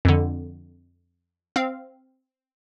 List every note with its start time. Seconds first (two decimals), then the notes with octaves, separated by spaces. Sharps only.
0.05 F2 D3
1.56 C4 F5